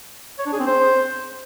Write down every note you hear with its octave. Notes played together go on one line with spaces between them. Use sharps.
C#5
D4
G#4
C4
C5